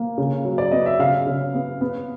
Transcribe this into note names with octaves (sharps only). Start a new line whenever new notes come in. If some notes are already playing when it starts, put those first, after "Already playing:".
Already playing: A#3
C#3
F#3
D5
B3 D#5
E5
C#3 F5
C#3
B3
B3